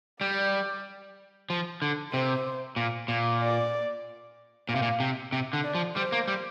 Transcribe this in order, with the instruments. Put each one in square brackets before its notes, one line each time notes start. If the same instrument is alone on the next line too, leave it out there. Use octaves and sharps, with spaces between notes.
[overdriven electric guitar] G3 [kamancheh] D5
[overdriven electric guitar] F3
D3
[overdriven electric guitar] C3 [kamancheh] C5
[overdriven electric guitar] A#2
A#2
[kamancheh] D5
[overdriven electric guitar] A#2 [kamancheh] F5
[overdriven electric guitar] C3
A#2
C3
C3
D3
[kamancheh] D5
[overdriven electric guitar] F3
[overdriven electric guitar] G3 [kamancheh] C5
[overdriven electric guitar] A#3
G3